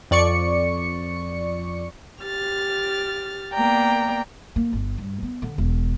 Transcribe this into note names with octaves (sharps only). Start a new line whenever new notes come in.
F2 D5 C#6 C#7
G4 F6 A6
A#3 B3 D5 G5 A#5
A#3
G1
G2
B3
D3
E1